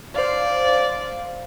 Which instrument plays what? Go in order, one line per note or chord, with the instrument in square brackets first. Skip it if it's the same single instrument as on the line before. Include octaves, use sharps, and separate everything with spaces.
[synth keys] C5 F5 [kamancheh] D5